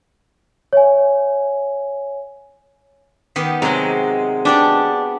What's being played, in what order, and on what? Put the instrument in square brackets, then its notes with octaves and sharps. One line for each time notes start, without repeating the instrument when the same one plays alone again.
[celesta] C#5 E5 G#5
[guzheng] D#3 B3 G4
[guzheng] C3 F#3 [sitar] G#3 [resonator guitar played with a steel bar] A#5
[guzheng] B3 G4 D5 [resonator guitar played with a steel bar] D4